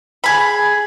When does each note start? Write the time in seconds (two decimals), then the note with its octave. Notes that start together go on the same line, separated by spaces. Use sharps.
0.24 G#4 B5